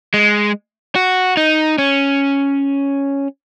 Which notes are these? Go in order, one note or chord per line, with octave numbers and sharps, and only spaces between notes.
G#3
F#4
D#4
C#4